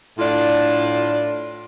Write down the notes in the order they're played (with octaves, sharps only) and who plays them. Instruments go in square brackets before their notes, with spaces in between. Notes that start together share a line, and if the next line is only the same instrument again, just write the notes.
[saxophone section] A2 D4 F4